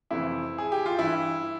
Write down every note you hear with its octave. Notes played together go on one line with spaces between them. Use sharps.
F2 C3 E3 E4
G#4
G4
F4
G2 E3 E4